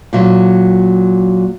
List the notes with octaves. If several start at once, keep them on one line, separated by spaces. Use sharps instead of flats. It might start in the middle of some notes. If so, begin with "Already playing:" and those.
A#2 F#3